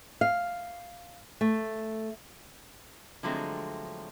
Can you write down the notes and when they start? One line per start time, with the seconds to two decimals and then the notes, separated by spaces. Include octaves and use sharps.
0.21 F5
1.41 A3
3.23 D3 F3 F#3 G#3 A3 C4